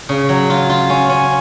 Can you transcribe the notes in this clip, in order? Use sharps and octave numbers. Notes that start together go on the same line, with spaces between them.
C#3
F#3
F4
F4
C#4
C#4